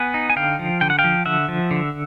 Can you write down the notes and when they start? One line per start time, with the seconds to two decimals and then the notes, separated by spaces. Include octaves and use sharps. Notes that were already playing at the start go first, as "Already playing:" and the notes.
Already playing: B3 F#5 G#5
0.14 D#4
0.30 G#5
0.36 D3 F5 G5
0.59 F3
0.81 D3 G5
0.90 F#5
0.99 F5 G5
1.04 F3
1.26 D3 E5 F#5
1.49 F3
1.71 D3